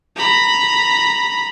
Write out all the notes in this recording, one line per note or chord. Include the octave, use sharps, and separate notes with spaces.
A#5 B5